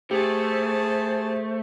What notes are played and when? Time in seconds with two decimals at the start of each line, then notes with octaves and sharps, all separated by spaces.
0.11 A3 G4 G#4 C5 A5